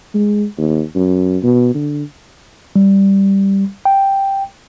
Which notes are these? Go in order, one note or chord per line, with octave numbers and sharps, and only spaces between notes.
G#3
D#2
F#2
B2
D3
G3
G5